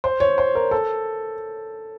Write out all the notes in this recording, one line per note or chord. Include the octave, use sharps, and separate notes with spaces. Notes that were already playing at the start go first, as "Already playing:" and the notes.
C5
C#5
C5
A#4
A4